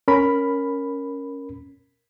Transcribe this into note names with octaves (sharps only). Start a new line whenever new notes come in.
C#4 A#4 B5